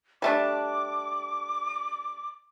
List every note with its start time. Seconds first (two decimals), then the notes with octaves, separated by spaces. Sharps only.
0.22 G3 A3 D4 D6